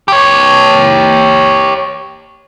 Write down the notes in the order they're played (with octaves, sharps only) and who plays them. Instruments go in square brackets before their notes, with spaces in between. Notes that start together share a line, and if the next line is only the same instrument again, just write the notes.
[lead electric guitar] G4 C#5